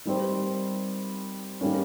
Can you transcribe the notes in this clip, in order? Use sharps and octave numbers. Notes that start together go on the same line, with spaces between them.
D#3 G3 C4
D#3 G3 A#3 C#4